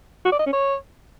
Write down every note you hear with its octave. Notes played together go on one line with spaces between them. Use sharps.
F#4
D5
D#5
C#4
C#5